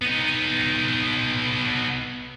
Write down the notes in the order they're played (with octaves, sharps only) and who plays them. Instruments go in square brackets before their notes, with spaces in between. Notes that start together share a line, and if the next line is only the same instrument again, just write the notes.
[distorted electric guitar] B3 D#4